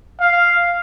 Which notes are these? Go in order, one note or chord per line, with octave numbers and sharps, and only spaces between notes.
F5